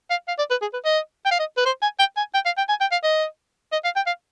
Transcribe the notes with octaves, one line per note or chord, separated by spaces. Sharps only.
F5
F5
D5
B4
G#4
B4
D#5
G5
F5
D#5
B4
C5
G#5
G5
G#5
G5
F5
G5
G#5
G5
F5
D#5
D#5
F5
G5
F5